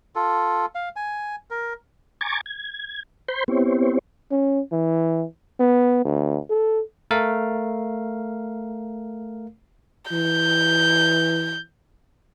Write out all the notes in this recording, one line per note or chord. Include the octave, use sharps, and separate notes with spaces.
F4 A4
F5
G#5
A#4
G#5 A#5 C#6 D6 G#6 A6
G#6
C5 B5 C6 G6
B3 C4 E4 G4 C5 C#5
C#4
E3
B3
D2
A4
A3 A#4 F5
E3 G6